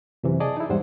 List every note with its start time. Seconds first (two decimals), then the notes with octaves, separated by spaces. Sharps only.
0.24 F#2 C3 E3
0.40 G#4 D5 D#5 A5
0.57 D#4 E4
0.69 E2 G#2 G3 C5 F#5